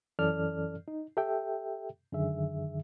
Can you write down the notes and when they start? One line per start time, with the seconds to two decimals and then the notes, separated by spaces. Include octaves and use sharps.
0.19 F#2 E3 C#4 A4 D5 F6
0.88 D#4
1.17 G4 A4 E5 G5
2.13 F#2 D3 D#3 G#4 E5